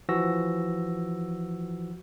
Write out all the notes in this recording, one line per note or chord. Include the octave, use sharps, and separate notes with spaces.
E3 F3 F#4 E6 A#6